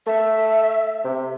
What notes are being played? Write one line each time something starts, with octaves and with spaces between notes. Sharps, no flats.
A3 E5
C3